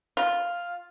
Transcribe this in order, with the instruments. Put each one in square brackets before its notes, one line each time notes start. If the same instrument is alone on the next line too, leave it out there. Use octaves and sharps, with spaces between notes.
[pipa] F4